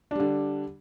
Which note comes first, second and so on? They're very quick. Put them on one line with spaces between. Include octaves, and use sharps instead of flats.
D4 G3 D3